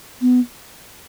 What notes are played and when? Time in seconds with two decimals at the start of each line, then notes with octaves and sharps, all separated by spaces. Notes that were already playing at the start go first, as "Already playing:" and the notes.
0.21 B3